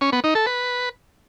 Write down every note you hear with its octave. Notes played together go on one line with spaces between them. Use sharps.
C#4
B3
D#4
A4
B4